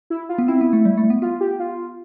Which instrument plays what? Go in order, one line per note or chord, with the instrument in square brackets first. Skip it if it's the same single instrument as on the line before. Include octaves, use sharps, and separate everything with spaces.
[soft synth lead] E4
F4
[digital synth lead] B3
[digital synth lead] C4 [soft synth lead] E4
[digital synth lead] B3
A3
G3
A3
B3
[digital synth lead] B3 [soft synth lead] F4
[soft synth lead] G4
F4